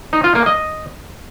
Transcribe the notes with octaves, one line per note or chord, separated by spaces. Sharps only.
D#4
F4
A#3
D#5